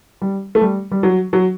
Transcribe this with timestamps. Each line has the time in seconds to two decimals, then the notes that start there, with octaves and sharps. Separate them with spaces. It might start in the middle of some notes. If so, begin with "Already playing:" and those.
0.22 G3
0.55 A3
0.61 G3
0.92 G3
1.03 F#3
1.33 F#3